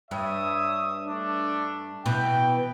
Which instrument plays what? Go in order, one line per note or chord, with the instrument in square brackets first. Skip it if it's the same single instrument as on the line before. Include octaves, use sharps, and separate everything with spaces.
[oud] G2 [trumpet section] C#5 E5 D#6
[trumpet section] A3 D4
[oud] B2 E3 [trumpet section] G5